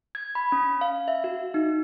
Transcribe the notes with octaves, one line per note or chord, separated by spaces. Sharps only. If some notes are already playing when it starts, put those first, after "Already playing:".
G#6
B5
C#4
F5
E5
F#4
D#4